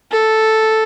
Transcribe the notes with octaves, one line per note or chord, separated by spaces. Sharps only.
A4